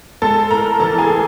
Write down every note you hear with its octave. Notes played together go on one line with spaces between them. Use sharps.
G#3 A4 A5
A2 A#4 A#5
E3 A4 A5
G#4 G#5
A2